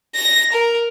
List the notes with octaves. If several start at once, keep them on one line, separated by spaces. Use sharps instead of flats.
A#6
A#4